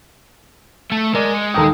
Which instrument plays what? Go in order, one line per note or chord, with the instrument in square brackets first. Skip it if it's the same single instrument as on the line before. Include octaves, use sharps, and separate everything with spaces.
[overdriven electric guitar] A3
[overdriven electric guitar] G#3 [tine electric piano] A#4 D5
[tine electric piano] C#7
[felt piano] D#2 A#5 D#6 [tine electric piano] A4 G5